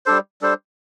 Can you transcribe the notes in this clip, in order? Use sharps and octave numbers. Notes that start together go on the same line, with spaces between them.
G3 D4 A4 C5
G3 D4 A4 C5